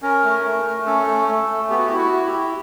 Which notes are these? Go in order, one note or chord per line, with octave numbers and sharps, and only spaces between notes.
C#4 A#4
A3
A3
A3
C#4 A4
A3
A3
A3
B3 G4
F#4
E4 G4
F#4
E4
G4
E4